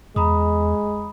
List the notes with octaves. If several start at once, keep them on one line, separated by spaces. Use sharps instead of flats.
E2 G#3 A#5 B5 D#6